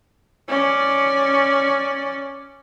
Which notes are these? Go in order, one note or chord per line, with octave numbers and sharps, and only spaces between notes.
C#4 D5